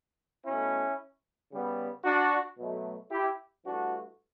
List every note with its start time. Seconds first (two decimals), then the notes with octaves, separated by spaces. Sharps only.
0.46 B2 A3 C#4 E4
1.51 C#3 G3 B3
2.05 D4 F#4
2.58 B2 F#3 A3
3.11 E4 G4
3.65 G2 E3 A3 D4 F#4